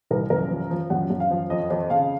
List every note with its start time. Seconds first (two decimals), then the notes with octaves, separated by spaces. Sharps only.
0.11 C2 A#4
0.30 F#2 A#4
0.50 F3
0.70 F3
0.90 F#2 F#5
1.10 F#2
1.20 F5
1.31 F3
1.50 F2 D#5
1.70 F2 D#5
1.90 C#3 F5